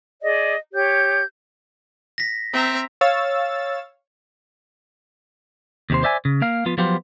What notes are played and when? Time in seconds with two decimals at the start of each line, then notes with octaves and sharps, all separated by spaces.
0.22 G#4 D5 D#5
0.73 G4 C#5 G6
2.18 A#6 B6
2.52 C4 E5 A#5
3.01 C#5 F5 E6 A6
5.90 D#2 C3 C5
6.03 C5 D5 E5 F#5 G#5
6.25 C#3
6.42 A#3 F5
6.66 F3 B3 F4
6.78 F3 F#3 B3 F4 G4 C5